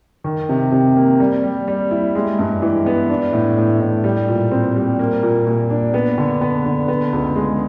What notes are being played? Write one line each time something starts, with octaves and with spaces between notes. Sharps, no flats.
D#3
C3
C3
A#3
G3
G3
G3
E4
G#3
G2
E3
B3
D4
A2
A2
A2
G3
A#2
C4
G3
A#3
A#2
A#2
D4
B3
D3
B3
D3
B3
C#2
G#3